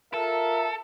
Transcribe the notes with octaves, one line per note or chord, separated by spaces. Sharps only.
F4 A4 A#4 E5 A5